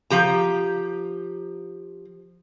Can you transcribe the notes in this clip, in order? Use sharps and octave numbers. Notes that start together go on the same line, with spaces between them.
F3 G4 A#5